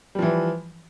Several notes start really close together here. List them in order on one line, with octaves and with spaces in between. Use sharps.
G3 F3 E3